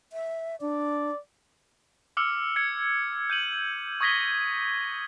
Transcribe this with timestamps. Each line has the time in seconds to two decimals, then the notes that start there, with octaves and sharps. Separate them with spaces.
0.13 E5
0.61 D4 D5
2.17 D6 E6 F6 C#7
2.56 G#6 C#7
3.30 G6 D#7 F#7
4.01 C#6 D#6 G#6 A#6 B6 G7